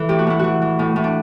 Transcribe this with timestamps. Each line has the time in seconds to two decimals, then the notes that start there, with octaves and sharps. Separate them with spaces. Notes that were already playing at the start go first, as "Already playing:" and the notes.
Already playing: E3 E4 A4
0.09 A2 G4
0.19 F#4
0.27 A2 E4
0.39 E3 F#4
0.62 E3
0.79 A2
0.96 A2
1.04 D4